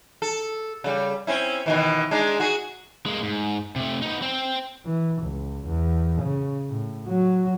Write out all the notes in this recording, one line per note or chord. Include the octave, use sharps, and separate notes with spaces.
A4
C#3 G3
C4 C#4 E4
B2 D#3 E3
G#3 D4 D#4
F#4 G#4
G#3 A#3
G#2
C3 A3
B3 D#4
C4 G5
E3
C#2
E2
C#3
A2
F#3